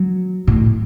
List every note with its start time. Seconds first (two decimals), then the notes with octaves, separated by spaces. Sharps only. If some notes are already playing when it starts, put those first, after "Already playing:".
Already playing: F#3
0.47 A2